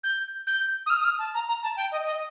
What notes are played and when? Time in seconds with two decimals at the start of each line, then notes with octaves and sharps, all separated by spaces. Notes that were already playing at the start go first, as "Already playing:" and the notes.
0.04 G6
0.47 G6
0.86 D#6
0.90 F6
1.01 D#6
1.04 F6
1.19 A5
1.34 A#5
1.48 A#5
1.63 A5
1.77 G5
1.92 D#5
2.07 D#5